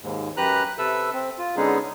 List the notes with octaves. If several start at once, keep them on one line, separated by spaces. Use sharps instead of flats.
D#2 G#2
F#2 G4 B4 A#5 F#6
C3 A4 B4 E5 E6
C4
F4
D3 G#3 B3 C#4 D#4 G#4